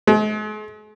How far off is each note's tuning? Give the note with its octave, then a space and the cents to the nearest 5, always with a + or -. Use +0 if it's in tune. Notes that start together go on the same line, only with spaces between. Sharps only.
G#3 +40